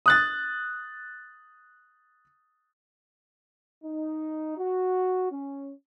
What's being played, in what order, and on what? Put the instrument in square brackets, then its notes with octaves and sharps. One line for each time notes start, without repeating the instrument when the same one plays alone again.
[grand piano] D#6 F#6 A6
[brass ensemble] D#4
F#4
C#4